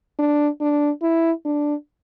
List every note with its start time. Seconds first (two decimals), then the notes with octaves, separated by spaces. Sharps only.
0.19 D4
0.61 D4
1.02 E4
1.45 D4